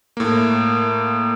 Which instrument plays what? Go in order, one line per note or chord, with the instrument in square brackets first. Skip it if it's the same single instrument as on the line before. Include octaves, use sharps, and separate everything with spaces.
[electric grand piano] A2 A#3